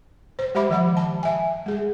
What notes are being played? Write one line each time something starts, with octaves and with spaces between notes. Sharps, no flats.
C5
G#3 G4 C5 E5 B5 D6
D#3 F3 F#5 B5
A5
E5 G#5
G#3 G#4